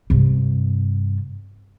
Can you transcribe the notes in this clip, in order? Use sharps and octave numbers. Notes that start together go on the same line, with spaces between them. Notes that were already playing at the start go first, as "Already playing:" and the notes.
G2 C3